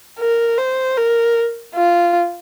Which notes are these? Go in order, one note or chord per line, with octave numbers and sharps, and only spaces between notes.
A#4
C5
A#4
F4